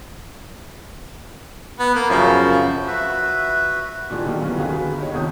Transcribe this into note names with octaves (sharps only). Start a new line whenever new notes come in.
B3
A#3
F#2 C#3 F3
F#4 B4 E5
A#2 E3 G3 D4 G#4
D3 D#3 F#3 A#3 D4
E3 F#3 G3 B3 C#4 F4
D2 D#3 F#4 G#4 B4 F5
D#4 G4 C#5
G#1 D#2 C3 F3 D#6 G6